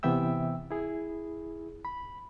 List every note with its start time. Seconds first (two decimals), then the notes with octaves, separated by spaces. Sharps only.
0.03 C3 E3 B3 E5 G5 E6
0.71 E4 G#4
1.85 B5